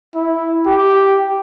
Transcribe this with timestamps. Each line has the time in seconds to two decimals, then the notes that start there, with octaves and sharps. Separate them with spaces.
0.15 E4
0.67 G4